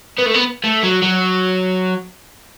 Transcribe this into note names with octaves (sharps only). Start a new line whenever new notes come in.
B3
A3
B3
A3
F#3
F#3